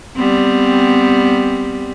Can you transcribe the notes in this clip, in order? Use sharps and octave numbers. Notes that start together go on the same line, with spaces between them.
G3 B3 C4